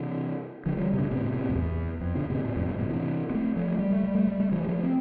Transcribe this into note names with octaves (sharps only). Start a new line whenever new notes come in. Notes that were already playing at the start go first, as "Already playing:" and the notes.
Already playing: C3 E3
D3 F3
E3 G3
C3
B2 D3
A2 C3
B2
A2 C3
F2
E2
F2
B2 D3
A2 C3
A2 C3
F2 A2
G2 B2
A2 C3
C3 E3
B3
A3 C4
F3 A3
G3
A3
G3
A3
G3
A3
E3 G3
G3
F3 A3
C4